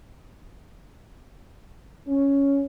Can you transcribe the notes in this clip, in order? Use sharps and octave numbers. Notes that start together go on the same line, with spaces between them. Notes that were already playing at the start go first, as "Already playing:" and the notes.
C#4